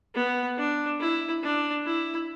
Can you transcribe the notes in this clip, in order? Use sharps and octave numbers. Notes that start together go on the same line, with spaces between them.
B3
D4
E4
D4
E4